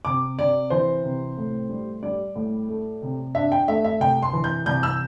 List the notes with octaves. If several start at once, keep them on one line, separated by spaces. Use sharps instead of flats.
C3 D6
C3 D5
E3 C5
C3
A2
G3
G3 D5
A2
A3
C3
D4 E5
G5
A3 E5
E5
C2 G5
C6
E3
G6
C2 G6
E6